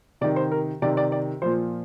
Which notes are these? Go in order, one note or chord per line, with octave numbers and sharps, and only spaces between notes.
C3 D#3 D5
C5
A#4
C3 D#3 D5
D5
D5
A#2 F3 C5